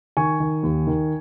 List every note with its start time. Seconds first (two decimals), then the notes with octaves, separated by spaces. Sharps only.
0.17 D#3 G#5 C#6
0.40 D#3
0.63 D#2
0.87 D#3